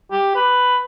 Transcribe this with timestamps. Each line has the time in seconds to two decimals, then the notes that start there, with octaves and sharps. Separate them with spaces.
0.11 G4
0.35 B4